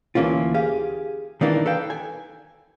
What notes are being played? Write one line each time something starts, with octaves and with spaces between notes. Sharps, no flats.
D2 E3 A#3 C#4 F4
G4 G#4 F5
D#3 E3 A#3 D4
A4 B4 F5 G5
G#5